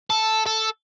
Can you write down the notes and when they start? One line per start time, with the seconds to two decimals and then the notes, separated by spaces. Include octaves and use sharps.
0.10 A4
0.46 A4